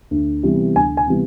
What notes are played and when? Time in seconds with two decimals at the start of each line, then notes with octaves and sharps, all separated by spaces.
0.11 D2
0.43 C3 E3 G3 B3
0.75 D2 G#5
0.97 G#5
1.08 C3 E3 G3 B3